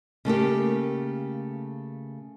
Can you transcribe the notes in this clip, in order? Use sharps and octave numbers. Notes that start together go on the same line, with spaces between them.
C#3 A3 A#3 G4